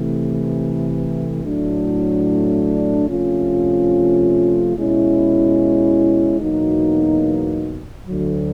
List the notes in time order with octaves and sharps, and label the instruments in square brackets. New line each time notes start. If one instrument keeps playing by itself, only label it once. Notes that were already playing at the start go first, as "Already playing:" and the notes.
Already playing: [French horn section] C3 E3 A3
A2 F#3 A3 D4
C3 F3 A3 C#4 F4
B2 G#3 C#4 E4
E2 B2 F#3 A#3 D#4
D2 D3 F#3